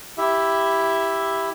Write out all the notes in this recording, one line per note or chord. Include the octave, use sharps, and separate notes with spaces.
E4 G4 E5